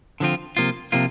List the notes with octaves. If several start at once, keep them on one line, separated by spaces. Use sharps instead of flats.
D3 F3 C4 F4
C3 F3 A#3 F4
C3 F3 A#3 F4